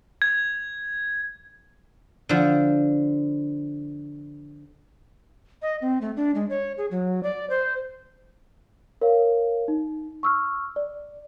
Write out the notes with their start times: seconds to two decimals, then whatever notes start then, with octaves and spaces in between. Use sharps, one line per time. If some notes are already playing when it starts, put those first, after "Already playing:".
0.22 G#6
2.29 D3 F3
5.62 D#5
5.81 C4
6.01 A3
6.16 D4
6.35 G#3
6.50 C#5
6.78 G#4
6.91 F#3
7.23 D5
7.50 C5
9.01 A#4 C#5 F5
9.68 D#4
10.23 C#6 E6 F6
10.76 D5